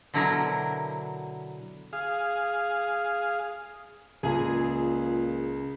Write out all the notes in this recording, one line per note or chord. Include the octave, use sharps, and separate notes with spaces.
B2 D3 F#3 E4 A#4
G#4 F5
C#2 A#2 G#4